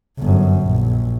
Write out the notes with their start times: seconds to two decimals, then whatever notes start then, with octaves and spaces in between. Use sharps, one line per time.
0.19 G1 F#2
0.67 A#1